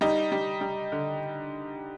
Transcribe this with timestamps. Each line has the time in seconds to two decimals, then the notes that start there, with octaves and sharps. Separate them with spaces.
0.01 G3 D#4
0.32 G3
0.61 G3
0.92 D3